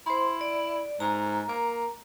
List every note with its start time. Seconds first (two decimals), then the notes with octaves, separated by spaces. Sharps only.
0.06 E4 C5 C6
0.41 D5
1.00 G#2 A#5
1.48 A#3